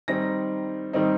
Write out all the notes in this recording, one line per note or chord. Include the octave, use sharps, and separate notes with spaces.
D#3 G3 C4 D#4 A#6
D#3 G3 C4 D#4